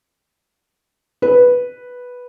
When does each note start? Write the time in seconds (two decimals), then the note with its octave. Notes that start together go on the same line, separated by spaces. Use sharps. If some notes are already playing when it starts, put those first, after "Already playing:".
1.22 B4